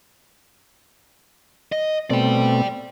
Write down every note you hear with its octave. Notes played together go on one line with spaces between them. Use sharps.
D#5
B2 A3 C4 D5 G5